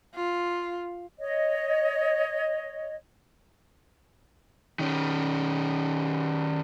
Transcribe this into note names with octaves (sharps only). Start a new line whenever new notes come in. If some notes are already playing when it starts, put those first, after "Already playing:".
F4
C#5 D#5
D#3 C#4